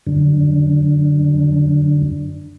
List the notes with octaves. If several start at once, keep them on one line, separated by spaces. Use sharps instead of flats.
F#2 D3